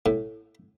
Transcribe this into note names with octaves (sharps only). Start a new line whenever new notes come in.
A2